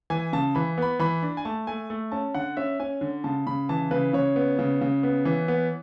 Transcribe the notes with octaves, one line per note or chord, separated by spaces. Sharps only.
E3 G#5
C#3 A5
E3 B5
B3 B5
E3 B5
D4
G#5
A3 A5
A3 G#5
A3
C#4 A5
D3 F#5
C#4 E5
C#4 G#5
D3
C#3 A5
C#3 B5
E3 A5
C#3 B4
C#3 C#5
B3
C#3
C#3
B3
E3
B3